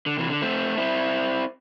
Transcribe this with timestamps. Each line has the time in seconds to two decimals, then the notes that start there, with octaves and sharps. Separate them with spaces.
0.06 D3
0.18 C3 E3
0.30 D3
0.42 A3 C4
0.77 C4 E4